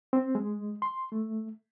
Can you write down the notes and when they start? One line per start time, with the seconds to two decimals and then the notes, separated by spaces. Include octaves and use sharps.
0.13 C4
0.35 G#3
0.82 C6
1.12 A3